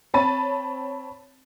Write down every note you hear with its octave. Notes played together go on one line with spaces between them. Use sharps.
C4 C#5 A5 B5 A6 D#7